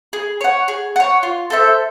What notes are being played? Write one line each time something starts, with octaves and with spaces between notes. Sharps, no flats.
G#4
C#5 F#5
G#4
C#5 F#5
F4
A4 C5 E5